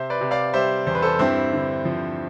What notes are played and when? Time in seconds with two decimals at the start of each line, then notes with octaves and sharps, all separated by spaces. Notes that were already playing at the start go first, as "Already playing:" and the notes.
Already playing: C3 C5 E5
0.10 B4 D5
0.21 C3
0.31 D5 F5
0.54 G3 C5 E5
0.86 E2 C5
0.95 B4
1.02 A4 C5
1.19 G2 C4 E4
1.52 D3
1.85 F3